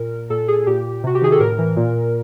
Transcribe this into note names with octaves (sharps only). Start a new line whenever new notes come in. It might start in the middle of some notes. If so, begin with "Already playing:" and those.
Already playing: A#2 A#4
A#2 A4
G#4
A#2 G4
C3 F#4
G4
D#3 G#4
A4
A2 A#4
E3
A#2